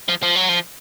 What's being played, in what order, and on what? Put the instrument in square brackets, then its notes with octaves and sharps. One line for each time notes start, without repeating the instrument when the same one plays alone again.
[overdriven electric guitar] F3
F3
F#3
F3